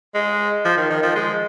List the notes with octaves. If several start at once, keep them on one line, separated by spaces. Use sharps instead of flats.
G#3
F3
D#3
D#3
F3
G#3